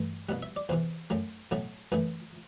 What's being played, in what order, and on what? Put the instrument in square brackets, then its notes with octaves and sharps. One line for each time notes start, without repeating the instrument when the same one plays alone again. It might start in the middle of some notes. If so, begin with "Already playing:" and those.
Already playing: [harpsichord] G2 E3 A3
C2 B2 G3 F#5
E5
D5
E2 C3 E3 C5
F#2 F#3 A3
B1 A2 F#3 A3
F#2 E3 A3 B4